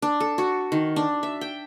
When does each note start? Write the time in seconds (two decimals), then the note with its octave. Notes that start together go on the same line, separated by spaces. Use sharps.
0.02 D4
0.20 A4
0.38 F#4
0.72 D#3
0.96 D4
1.23 E5
1.41 G5